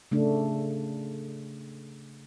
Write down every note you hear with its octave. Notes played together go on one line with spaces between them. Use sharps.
C#3 A3 D4